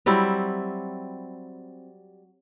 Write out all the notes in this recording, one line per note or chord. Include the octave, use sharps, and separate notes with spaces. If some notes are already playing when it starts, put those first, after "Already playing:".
F#3 G3 C4 E4